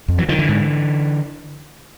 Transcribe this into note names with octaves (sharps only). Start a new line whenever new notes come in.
F2
E3 F#3
D3 D#3 F3
D3 E3
G#2